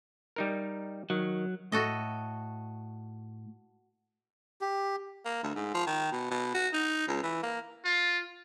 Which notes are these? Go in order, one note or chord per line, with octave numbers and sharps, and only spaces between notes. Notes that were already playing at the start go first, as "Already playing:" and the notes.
G3 D#4 A#4
D#3 F#3
A2 F#4 A4 D#5
G4
A#3
D2
G#2
F3
D#3
B2
B2
F#4
D#4
C#2
E3
A#3
F4